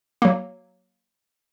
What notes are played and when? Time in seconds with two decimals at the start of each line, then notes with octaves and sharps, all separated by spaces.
0.22 F#3 A#3